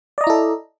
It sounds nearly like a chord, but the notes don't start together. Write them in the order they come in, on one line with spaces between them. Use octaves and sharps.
D5 D#5 A#5 E4 A4